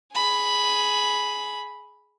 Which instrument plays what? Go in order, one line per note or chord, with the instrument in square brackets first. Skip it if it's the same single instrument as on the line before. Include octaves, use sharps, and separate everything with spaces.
[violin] G#4 B5